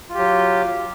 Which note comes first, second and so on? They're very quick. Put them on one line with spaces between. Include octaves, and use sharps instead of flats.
F4 G4 F#3